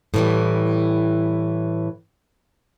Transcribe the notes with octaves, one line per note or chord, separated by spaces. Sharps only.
A2 E3 G3